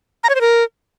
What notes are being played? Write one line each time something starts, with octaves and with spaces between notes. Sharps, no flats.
A#5
C#5
C5
A#4